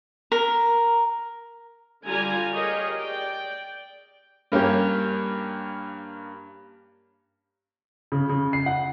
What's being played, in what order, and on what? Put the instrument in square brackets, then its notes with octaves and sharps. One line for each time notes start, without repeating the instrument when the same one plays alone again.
[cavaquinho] A#4
[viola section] D3 G3 F4 G#5 A#5
G4 G#4 A#4 C#5 D#5
D5 G5
[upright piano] G2 A#3 C#4 G4
C#3
C#3
C7
F#5